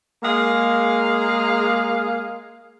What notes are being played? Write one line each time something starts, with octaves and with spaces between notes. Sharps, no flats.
G#3 A#3 G#4 F5